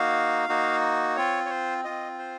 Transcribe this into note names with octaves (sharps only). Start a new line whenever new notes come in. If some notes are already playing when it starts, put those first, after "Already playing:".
Already playing: A#3 D#4 F#4 F5
A#3 D#4 F#4
C4 F4 C#5
C#5
C5
C4 F4 D#5
C5